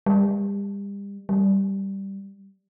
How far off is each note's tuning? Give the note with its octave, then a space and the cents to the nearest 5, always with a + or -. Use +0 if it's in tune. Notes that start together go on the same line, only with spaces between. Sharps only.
G3 +35
G3 -5